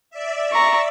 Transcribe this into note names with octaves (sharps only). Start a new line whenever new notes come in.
D5 E5
A#5 C#6